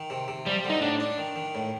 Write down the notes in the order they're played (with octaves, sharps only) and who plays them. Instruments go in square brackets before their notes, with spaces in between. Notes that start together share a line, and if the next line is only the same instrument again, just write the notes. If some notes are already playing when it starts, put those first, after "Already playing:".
Already playing: [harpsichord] D#3
C3
C3
[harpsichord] F3 [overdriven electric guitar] G3
[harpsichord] D3
[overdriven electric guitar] D#4
[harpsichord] A2 [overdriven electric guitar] D4
[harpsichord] D4
D#3
D#3
A2